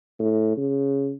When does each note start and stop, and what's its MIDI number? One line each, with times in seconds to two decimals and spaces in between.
0.20 0.53 45
0.57 1.13 49